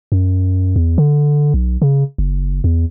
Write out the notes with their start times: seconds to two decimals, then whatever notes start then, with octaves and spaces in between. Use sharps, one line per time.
0.12 F#2
0.76 E2
0.98 D3
1.54 B1
1.82 C#3
2.18 F#1
2.64 E2